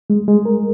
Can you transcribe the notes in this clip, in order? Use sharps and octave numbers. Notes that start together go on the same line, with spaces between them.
G#3
G#3
A#4